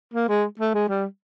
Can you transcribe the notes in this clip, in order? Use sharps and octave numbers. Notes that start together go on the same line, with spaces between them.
A#3
G#3
A3
G#3
G3